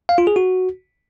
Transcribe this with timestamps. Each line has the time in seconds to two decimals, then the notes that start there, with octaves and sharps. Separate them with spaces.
0.09 F5
0.18 F4
0.27 G#4
0.36 F#4